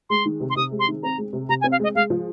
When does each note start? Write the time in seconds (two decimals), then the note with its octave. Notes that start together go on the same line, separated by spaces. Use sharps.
0.10 G#3 C6
0.25 D#3
0.40 C3
0.50 C6
0.56 C3 D#6
0.71 G#3
0.79 C6
0.88 D#3
1.03 C4 A#5
1.18 G#3
1.33 C3
1.49 C3 A#5
1.61 G#5
1.64 C4
1.72 F5
1.80 G#3 D#5
1.95 G#3 F5
2.10 F3